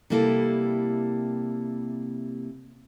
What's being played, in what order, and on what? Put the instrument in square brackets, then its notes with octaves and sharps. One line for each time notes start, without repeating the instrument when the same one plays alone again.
[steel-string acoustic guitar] C3 G3 A#3 E4 A4